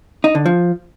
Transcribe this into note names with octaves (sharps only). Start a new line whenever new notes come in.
D#4
D3
F3